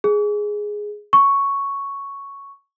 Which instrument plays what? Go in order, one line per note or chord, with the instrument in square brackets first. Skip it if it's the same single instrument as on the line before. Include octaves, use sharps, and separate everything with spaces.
[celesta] G#4
C#6